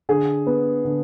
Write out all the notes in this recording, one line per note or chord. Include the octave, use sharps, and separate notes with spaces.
D3 G#4
B3
D3